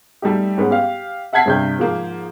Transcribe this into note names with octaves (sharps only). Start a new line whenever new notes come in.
G3 A3 D#4 G4
G#2 B3 C#4
G4 F5
E5 F#5 A5 G#6 B6 C7
G2 C3 G6
G#2 F3 A#3